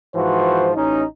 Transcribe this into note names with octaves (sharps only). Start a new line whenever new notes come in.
G#2 E3 F3 F#4 C5
A1 C#4 D#4